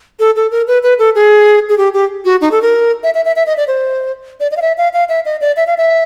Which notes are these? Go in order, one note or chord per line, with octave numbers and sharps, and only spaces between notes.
A4
A4
A#4
B4
B4
A4
G#4
G#4
G4
G4
F#4
D#4
A4
A#4
E5
E5
E5
E5
D#5
D5
C5
D5
D#5
F5
E5
F5
F5
E5
D#5
D5
E5
F5
E5